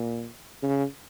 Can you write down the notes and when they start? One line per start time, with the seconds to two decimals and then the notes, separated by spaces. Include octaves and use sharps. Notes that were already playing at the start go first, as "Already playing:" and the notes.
Already playing: A#2
0.63 C#3